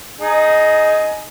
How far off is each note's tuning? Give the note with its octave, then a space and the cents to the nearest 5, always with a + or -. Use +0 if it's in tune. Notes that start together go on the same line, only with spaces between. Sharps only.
D#4 +0 G#4 +20